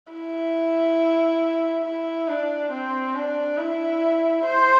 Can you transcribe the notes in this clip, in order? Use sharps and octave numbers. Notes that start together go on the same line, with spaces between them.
E4
E4
D4
C4
D4
E4
C5